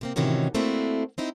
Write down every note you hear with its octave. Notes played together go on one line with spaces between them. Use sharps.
C3 A#3 C4
A2 C3 D#3 E3 C#4 F#4
A3 A#3 C4 D4 E4 F#4
C4 D#4 E4